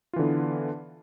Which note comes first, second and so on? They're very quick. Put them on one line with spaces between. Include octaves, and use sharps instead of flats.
F4 E3 D3 B3